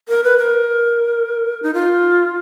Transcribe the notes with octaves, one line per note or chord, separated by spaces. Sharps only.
A#4
B4
A#4
D#4
F4